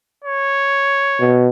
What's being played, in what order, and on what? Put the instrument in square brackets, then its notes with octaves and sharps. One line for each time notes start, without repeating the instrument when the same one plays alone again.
[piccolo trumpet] C#5
[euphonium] B2